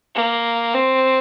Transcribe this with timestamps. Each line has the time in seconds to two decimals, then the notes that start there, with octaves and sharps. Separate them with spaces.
0.15 A#3
0.74 C4